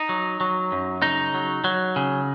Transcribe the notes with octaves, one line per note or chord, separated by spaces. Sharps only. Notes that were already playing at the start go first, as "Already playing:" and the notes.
Already playing: D#4
F#3
F#3
F#2
C#3 D#4
F#3
F#3
C#3